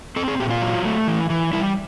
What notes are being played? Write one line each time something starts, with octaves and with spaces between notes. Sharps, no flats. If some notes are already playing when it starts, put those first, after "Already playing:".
C4 A4
G#4
A#2 G4
F4
F#3
A3
E3
E3
G3 E4